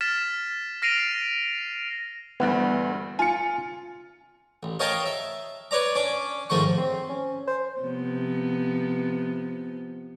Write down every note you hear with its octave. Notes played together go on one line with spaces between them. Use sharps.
F6 A6 B6 E7
F6 A#6 C7 D7 D#7 F7
D2 G2 E3 B3
F4 G#5 C#7
A1
A#4 C#5 D#5 F5 G5 A5
E5
B4 C#5 D5 A#5
C#4 D4 D6
G#2 D#3 F3 A3 C#6
C4
C#4
C5
C3 F3 B3